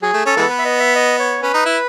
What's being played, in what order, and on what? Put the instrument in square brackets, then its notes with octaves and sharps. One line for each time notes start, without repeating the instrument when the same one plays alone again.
[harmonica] F#3 [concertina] G#4
[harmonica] A3
[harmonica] C#4 [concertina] A4
[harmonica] E3 G#3 B3
[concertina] B4
E5
D#5
E5
D#5
C#5
[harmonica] C#4 [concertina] B4
[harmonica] D#4
E4